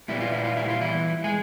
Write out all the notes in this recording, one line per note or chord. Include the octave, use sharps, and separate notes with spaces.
A#2 G3 B3 E4
F4
E4
F4
E4
F4
E3 E4
G#3 G#4